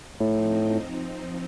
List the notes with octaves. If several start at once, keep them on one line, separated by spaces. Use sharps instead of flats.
A2 F3 C4 D#4